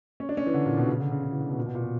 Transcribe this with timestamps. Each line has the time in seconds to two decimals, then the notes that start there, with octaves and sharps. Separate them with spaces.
0.20 C#4
0.29 D4
0.37 C#4
0.46 E3
0.54 D3
0.66 A#2
0.77 B2
0.85 D3
0.89 C#3
1.00 D3
1.12 C#3
1.23 D3
1.32 E3
1.40 D3
1.49 B2
1.58 A#2
1.66 B2
1.75 A#2
1.83 B2